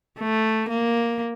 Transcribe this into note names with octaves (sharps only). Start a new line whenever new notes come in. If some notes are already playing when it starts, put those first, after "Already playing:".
A3
A#3